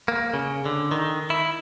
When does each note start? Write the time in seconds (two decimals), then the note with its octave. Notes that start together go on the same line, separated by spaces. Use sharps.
0.08 A#3
0.34 C#3
0.66 D3
0.91 D#3
1.30 E4